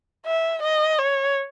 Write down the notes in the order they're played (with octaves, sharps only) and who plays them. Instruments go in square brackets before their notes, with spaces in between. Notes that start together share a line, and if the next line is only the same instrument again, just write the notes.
[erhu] E5
D#5
C#5